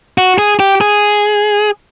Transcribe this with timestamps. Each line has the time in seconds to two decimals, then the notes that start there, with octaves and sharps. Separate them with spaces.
0.18 F#4
0.38 G#4
0.60 G4
0.81 G#4